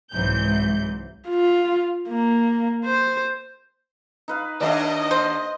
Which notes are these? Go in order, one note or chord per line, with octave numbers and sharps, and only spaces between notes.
C2 G#2 E3 F#3 G6
F4
A#3
C5
D#4 B4 F5
D#2 A3 D4 D#5
C5